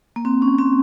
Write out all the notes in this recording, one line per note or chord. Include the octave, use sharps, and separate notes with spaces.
A#3
C4
C#4
C4